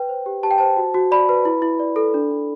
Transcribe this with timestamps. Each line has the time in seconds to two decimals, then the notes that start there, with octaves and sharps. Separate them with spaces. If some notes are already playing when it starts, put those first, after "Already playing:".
Already playing: B4 G5
0.09 C5
0.26 G4
0.43 G4 A5
0.51 G5
0.58 C5 A5
0.77 F#4
0.94 F#4
1.11 D5 B5
1.29 B4
1.45 E4
1.62 E4
1.79 D5
1.96 A4
2.14 D4
2.31 D4